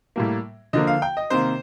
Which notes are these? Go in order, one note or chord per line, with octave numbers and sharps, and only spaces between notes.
A2 G3 A#3
D3 F3 A#3 D#5
F5
G5
D#5
C3 D#3 A#3 C5